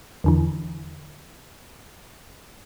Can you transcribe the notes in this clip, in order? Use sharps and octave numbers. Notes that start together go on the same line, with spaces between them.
E2 D3 E3